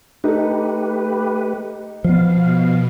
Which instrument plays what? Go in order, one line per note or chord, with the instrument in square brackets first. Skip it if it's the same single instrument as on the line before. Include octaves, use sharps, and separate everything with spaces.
[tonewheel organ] A3 G4 B4 [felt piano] D#4 A4
[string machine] B2 [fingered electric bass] F3 B3 [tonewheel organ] F5